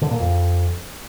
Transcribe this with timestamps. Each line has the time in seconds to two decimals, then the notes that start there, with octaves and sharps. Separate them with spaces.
0.01 D3
0.11 A#2
0.20 F2